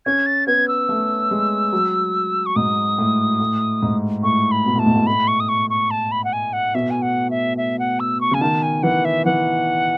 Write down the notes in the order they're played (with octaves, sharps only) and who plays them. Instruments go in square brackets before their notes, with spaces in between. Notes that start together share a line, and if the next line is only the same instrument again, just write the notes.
[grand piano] C#4 [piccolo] G#6
[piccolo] A6
[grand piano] B3 [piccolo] G#6
[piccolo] E6
[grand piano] A3
G#3
F#3
[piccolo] C#6
[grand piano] G#2 [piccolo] D#6
[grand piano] A2
A2
G#2
[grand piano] A2 [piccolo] C#6
[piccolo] B5
[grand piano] B2
[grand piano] A2 [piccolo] A5
[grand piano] G#2
A2
[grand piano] A2 [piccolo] B5
[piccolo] C#6
D#6
C#6
C#6
A5
B5
F#5
G#5
F#5
[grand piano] B2 [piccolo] E5
[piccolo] G#5
F#5
E5
E5
F#5
E6
C#6
[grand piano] C#3 [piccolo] G#5
[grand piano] D#3 [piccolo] A5
[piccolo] G#5
[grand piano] E3 [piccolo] F#5
[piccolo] E5
[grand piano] E3 [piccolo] F#5